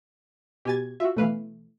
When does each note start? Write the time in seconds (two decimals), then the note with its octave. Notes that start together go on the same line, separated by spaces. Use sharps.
0.65 B2 G4 G#5 G#6 A6
1.00 F4 F#4 E5
1.17 B2 E3 A3 B4 F5